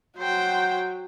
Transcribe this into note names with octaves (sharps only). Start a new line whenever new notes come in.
F#3 C5 G5